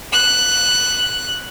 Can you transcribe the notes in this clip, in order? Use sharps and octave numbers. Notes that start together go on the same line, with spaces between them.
F#6